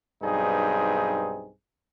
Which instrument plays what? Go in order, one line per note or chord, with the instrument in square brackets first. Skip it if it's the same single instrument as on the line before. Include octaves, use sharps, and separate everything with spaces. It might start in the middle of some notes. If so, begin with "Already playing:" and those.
[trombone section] B1 G2 C4 D#4 G#4